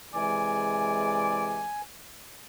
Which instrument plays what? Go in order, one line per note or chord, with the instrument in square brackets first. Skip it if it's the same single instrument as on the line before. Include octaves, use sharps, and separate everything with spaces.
[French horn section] C3 E3 G#3 [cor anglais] D5 [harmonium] G#5